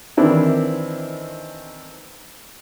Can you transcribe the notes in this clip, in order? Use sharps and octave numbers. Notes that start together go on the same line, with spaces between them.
D#3 E3 C4 D4 E4